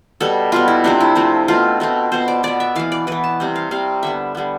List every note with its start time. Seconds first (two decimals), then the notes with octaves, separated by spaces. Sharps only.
0.20 B2 G3 B3 A4
0.52 B2 G3 B3 F4
0.68 E4
0.84 C3 F3 A3 C4 D4
1.00 E4
1.15 C3 F3 A3 C4
1.48 B2 A3 C4 F4
1.80 B2 A3 C4
2.12 B2 B3 C5
2.28 D5
2.43 B2 B3 D5
2.60 E5
2.75 E3 B3 F5
2.92 D5
3.07 E3 B3 B4
3.24 A5
3.40 C3 G3 C4
3.56 F5
3.71 C3 G3 C4 F5
4.03 D3 G3 B3 E5
4.35 D3 G3 B3